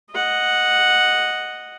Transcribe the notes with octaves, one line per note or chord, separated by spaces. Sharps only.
D#5 F#5